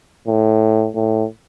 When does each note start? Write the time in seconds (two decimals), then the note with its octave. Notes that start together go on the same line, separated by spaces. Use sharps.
0.28 A2
0.95 A2